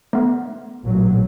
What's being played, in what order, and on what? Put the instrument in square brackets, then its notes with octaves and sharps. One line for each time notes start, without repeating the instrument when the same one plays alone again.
[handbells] A3 B3
[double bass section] A1 A#2 F#3